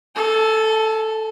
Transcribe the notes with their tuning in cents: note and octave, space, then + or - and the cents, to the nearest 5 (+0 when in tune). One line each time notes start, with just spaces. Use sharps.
A4 +0 G#5 +40